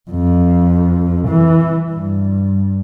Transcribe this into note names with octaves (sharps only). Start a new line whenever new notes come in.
F2
E3
G2